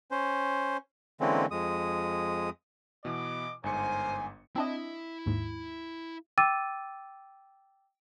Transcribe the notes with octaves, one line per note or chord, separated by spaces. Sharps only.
C#4 C5
D3 E3 G#3 A#3 C4 C#4
F2 G#3 D#6
B2 E3 B3 D#5 D6
G1 G#2 A#4 C5 G#5 C#7
C4 D4 E4 D#5 E5
D#2 G#2
G5 D6 E6 A6 D#7